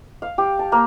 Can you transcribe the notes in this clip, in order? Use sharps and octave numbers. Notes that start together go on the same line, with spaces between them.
F5
G4
A5
A#3